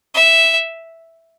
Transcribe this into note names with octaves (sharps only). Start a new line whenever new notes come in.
E5